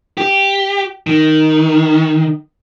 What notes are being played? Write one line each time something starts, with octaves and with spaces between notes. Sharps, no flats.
G4
D#3